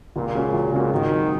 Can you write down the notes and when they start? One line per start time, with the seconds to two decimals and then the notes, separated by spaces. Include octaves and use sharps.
0.16 C#2 A#2
0.35 C#3 G#3 C#4 F#4
0.54 C#2
0.72 C#3 G#3 C#4 F#4
0.92 G#1 D#3
1.10 G#2 F#3